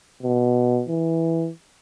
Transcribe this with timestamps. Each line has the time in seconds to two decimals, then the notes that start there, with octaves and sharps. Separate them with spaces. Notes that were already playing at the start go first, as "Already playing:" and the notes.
0.23 B2
0.89 E3